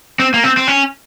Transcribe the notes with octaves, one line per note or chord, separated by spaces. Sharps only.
C4
A#3
C4
C4
C#4